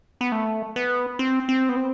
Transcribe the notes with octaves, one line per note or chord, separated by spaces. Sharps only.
B3
A3
B3
C4
C4
B3
C4